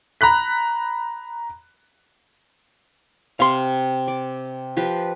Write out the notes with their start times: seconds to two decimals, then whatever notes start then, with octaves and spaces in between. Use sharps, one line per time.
0.21 A#5 B5 F#6 B6
3.40 C3 F5 C6
4.08 D5
4.77 F3 G4 B4